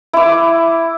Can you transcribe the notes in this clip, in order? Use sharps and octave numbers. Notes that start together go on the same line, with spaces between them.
E4 D6